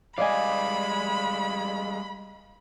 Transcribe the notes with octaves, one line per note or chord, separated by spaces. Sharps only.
G3 G#3 D5 D#5 F5 G#5 B5